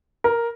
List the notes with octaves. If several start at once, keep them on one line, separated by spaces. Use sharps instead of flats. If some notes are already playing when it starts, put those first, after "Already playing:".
A#4